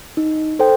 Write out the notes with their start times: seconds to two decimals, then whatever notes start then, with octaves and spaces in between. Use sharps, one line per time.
0.17 D#4
0.59 A4 C5 G5